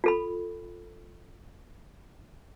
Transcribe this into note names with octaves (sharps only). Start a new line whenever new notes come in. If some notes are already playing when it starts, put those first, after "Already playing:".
F4 A4 B5